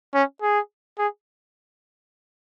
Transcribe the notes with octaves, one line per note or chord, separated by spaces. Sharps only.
C#4
G#4
G#4